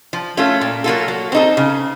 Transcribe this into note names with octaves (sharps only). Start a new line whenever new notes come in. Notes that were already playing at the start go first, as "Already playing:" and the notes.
F3
A3 C#4 F4 A4
A#2
F#3 A#3 F4 A4
F#3
C4 D#4 A4
C#3